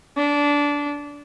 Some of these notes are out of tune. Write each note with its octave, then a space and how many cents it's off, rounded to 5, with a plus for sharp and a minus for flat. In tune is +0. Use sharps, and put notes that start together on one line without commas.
D4 -20